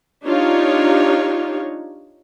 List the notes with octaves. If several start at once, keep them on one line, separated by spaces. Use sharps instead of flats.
D4 D#4 F4 G4 C#5